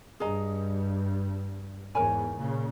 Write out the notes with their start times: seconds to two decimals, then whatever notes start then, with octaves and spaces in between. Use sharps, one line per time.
0.20 G2 G#4 D#5 A#5
1.94 E2 G#2 A#4 C#5 G#5 B5
2.37 A#2 C#3